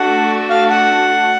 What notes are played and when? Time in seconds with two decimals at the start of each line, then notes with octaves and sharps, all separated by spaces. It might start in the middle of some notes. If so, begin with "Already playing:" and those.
Already playing: A3 D4 F#4 F#5
0.50 F5
0.70 F#5